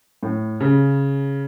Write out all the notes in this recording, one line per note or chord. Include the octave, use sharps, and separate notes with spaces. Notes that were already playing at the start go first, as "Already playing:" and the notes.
A2
C#3